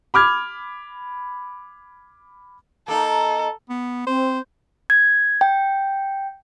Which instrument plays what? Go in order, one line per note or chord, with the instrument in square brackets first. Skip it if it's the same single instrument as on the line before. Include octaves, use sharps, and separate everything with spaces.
[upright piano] B5 D6 F6 G#6
[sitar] A#3 D#4 [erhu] A4
[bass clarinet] B3
[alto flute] C4 [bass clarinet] C5
[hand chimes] G#6
G5